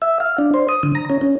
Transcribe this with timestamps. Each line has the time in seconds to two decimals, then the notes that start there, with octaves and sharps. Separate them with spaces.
0.02 E5
0.20 F5
0.38 D4
0.54 C5
0.69 D#6
0.83 D3
0.95 A#5
1.10 C#4
1.21 C#4